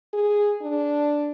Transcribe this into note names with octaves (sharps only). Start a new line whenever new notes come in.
G#4
D4